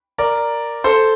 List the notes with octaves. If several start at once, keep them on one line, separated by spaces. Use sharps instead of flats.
A#4 D5
A4 C5